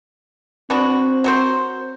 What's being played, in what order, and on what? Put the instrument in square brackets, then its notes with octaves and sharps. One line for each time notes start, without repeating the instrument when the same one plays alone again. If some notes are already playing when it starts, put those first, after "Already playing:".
[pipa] B3 D4 F#4 [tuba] C4
[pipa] F#3 F#4 C5